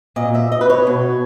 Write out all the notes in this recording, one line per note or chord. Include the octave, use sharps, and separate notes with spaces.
A#2 D#5
E5
D#5
B4
C#5
B2